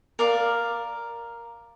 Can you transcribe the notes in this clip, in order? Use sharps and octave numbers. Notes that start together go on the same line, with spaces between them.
A#4 D5 F5